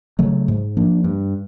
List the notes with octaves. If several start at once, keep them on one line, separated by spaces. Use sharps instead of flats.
C#3 F#3 A3
G#2
F3 A#3 D4
G2